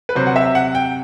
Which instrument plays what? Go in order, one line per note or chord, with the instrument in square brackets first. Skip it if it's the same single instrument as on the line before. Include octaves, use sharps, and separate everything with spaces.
[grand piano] B4
C3 F#3 C5
F#5
E5
F#5
G5